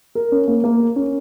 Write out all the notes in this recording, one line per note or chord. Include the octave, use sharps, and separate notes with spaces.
A#4
C#4
A#3
A#3
A#4
C#4